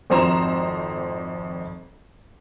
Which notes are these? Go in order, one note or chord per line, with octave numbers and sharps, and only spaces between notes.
G#1 F2 C4 A#5 C6 E7